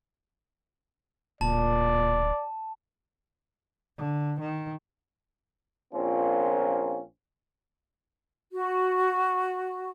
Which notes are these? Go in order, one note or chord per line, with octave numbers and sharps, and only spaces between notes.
D1 A#2 D5 A5
D3
D#3
A#1 A#3 C4 C#4 F4
F#4